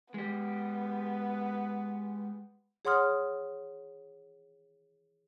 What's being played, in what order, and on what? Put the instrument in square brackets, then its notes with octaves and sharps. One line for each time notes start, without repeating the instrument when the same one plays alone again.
[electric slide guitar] G#3 G4 [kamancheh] B3
[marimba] G#4 C#5 F#5 C6 D#6 F6